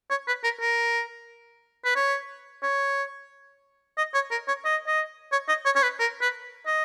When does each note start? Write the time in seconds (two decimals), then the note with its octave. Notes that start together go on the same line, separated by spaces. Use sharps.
0.11 C#5
0.27 B4
0.44 A#4
0.61 A#4
1.85 B4
1.96 C#5
2.63 C#5
3.98 D#5
4.14 C#5
4.31 A#4
4.48 C#5
4.65 D#5
4.87 D#5
5.32 C#5
5.49 D#5
5.66 C#5
5.76 C#5
5.83 B4
5.99 A#4
6.21 B4
6.67 D#5